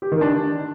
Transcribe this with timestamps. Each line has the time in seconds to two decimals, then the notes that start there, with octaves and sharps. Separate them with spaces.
0.02 G4
0.12 D#3
0.21 D4